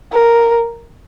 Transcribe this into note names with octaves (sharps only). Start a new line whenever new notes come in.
A#4